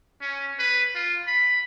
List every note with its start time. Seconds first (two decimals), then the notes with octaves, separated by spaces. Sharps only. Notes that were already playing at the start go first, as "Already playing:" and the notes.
0.21 C#4
0.59 B4
0.95 F4
1.28 B5